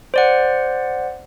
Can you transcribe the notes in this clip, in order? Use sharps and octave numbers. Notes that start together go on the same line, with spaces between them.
C5 D5 F#5